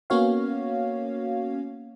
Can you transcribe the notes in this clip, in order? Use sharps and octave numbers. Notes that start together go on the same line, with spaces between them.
A#3 B3 C#4 F#4 C#5 F5